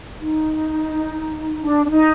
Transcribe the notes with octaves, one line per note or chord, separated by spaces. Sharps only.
D#4
D4
D4
D#4